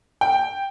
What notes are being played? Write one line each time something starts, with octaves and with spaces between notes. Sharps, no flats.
G5